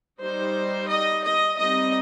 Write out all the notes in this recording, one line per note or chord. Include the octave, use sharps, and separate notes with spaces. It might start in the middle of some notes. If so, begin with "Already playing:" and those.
G3 D#4 C5
D#5
D#5
G3 C4 D#4 D#5